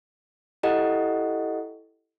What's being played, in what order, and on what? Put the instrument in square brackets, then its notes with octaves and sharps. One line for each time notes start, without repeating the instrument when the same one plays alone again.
[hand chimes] E4 G4 A4 D#5 F#5